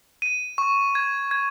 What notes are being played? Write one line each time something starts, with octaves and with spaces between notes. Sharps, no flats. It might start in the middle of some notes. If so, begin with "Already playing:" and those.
D#7
C#6
G#6
G#6